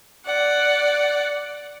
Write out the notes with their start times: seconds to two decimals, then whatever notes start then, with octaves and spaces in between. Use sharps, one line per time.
0.25 D5 F#5